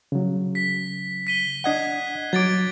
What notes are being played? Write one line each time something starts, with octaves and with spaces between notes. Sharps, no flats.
C#3 F#3
B6
B6 D#7 G7
D4 D#5 F#5 F#6 G#6 C7
F#3 D6 G#6 A6 D7